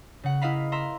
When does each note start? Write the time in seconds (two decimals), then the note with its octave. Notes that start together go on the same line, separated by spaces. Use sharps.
0.23 C#3 F#5
0.42 E4 A#4 D#5 F5 B5
0.72 E5 A#5 C6